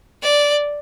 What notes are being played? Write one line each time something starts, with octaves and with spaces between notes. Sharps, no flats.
D5